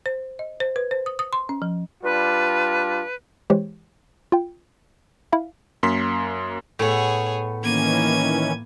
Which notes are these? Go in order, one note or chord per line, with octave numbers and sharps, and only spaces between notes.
C5
D#5
C5
B4
C5
D#6
D#6
C6
C#4
F3
G3 D4 F4 B4
E3 G#3 G4 C5 C#5
F4 G5
E4 E5 F5
F#2 A#3 C6 B6
A2 B3 G#4 C#5
D#3 E3 A#3 C#4 G#6 D#7